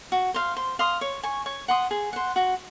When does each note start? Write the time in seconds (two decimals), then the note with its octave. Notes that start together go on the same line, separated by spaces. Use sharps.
0.12 F#4
0.34 C5 F5
0.57 C5
0.79 F5 C6 D#6
1.01 C#5
1.23 G#5 C#6
1.46 C#5
1.68 F#5 C6 D#6
1.91 G#4
2.13 C5 F#5
2.36 F#4